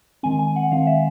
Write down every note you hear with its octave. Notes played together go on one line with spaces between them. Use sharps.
D#3 G#3 C4 G#5
G#5
F#5
D#3 G#3 C4 F5
E5